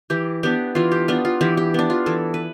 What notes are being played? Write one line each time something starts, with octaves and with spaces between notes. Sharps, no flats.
E3 G4
B3 D4 G4
E3 F4
G4
B3 D4 F4
F4
E3 G4
G4
B3 D4
F4
E3 A4
B4